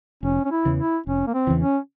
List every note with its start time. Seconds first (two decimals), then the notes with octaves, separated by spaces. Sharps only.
0.23 F1 C#4
0.45 C#4
0.51 E4
0.65 E2 C#3 E3
0.78 E4
1.06 F1 C#4
1.27 A#3
1.34 C4
1.47 E2 C#3 E3
1.61 C#4